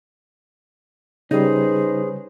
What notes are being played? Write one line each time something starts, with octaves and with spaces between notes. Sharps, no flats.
C#3 G3 C#4 D#4 G#4 B4 C5